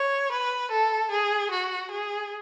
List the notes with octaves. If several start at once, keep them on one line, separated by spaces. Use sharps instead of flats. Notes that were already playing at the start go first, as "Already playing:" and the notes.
Already playing: C#5
B4
A4
G#4
F#4
G#4